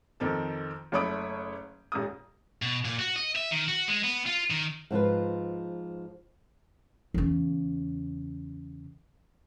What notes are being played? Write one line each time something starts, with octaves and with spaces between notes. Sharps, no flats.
F2 D#3 C4 A4
F#1 A3 C#5 B5 D#6 D7
D#1 G#2 D#6
B2
A#2
F#4
D#5
E5
D#3
F#4
G#3
B3
F4
D#3
G#2 F3 F4 B4
E2 C#3